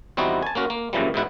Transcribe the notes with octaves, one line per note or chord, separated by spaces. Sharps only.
E2 G3 C4 D#4 E4 F#4
G#5 A5
A#3 C#4 F#4 A#4
A#3
F#2 A#2 C#3 E3 F3 G3
G#2 B2 E4 F#5